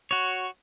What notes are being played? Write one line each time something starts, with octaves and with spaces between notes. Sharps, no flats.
F#4 C#5